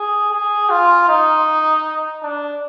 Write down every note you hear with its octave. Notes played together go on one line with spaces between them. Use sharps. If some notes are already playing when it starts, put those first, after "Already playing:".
Already playing: G#4
G#4
F4
D#4
D4